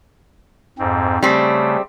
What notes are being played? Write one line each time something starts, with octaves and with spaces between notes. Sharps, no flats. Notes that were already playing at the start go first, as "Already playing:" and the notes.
F2 G#2 C4
C#3 G3 A3 C4